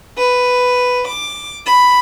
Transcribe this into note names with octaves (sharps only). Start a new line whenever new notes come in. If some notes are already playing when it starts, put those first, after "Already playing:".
B4
D6
B5